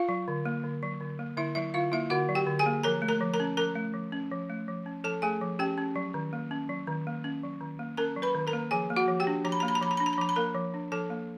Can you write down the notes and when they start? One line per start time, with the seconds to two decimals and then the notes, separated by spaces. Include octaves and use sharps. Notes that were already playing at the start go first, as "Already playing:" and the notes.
Already playing: F4 F5
0.09 F#3
0.28 D3
0.45 A#3
0.64 D3
0.83 F#3
1.01 D3
1.19 A#3
1.37 D3 E4 E5
1.55 F#3 E4 E5
1.74 D3 F4 F5
1.92 A#3 E4 E5
2.10 D3 F#4 F#5
2.29 F#3
2.35 G4 G5
2.47 D3
2.59 G#4 G#5
2.66 A#3
2.83 F3 A#4 A#5
3.02 A3
3.08 A#4 A#5
3.21 F3
3.34 A#4 A#5
3.40 C#4
3.57 F3 A#4 A#5
3.76 A3
3.94 F3
4.12 C#4
4.32 F3
4.50 A3
4.68 F3
4.86 C#4
5.04 F3 A4 A5
5.22 A3 G#4 G#5
5.41 F3
5.59 C#4 G4 G5
5.78 C#4
5.96 F#3
6.14 D#3
6.33 A#3
6.51 C#4
6.69 F#3
6.87 D#3
7.07 A#3
7.24 C#4
7.43 F#3
7.61 D#3
7.79 A#3
7.97 C#4 A#4 A#5
8.17 F#3
8.22 B4 B5
8.35 D#3
8.47 A#4 A#5
8.53 A#3
8.71 F3 G#4 G#5
8.90 A#3
8.96 F#4 F#5
9.08 F3
9.20 G4 G5
9.27 D4
9.44 F3 A#5
9.52 B5
9.60 A#3 A#5
9.68 B5
9.75 A#5
9.81 F3 B5
9.91 A#5
9.97 B5
10.00 D4
10.06 A#5
10.13 B5
10.18 F3 A#5
10.29 B5
10.36 A#3 A#4 A#5
10.55 F3
10.74 D4
10.92 F3 A4 A5
11.10 A#3